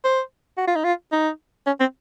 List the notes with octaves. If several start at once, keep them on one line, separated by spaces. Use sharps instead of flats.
C5
F#4
F4
D#4
F4
D#4
C#4
C4